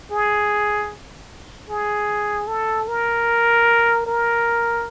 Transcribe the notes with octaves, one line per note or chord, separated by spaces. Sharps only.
G#4
G#4
A4
A#4
A#4